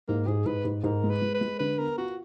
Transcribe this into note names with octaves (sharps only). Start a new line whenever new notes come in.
G#2 A#3
G#2 G#4
G#2 B4
G#2
G#2 A#4
G#3
B4
G#3
B4
G#3
D3 B4
B3 A#4
F4 F#4